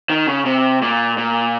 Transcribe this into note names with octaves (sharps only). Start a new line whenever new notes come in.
D#3
C#3
C3
A#2
A#2